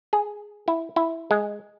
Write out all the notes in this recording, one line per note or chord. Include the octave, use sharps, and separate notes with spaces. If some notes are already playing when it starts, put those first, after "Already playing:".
G#4
E4
E4
G#3